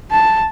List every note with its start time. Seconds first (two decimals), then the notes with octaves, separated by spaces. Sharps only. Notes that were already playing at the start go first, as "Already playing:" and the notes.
0.11 A5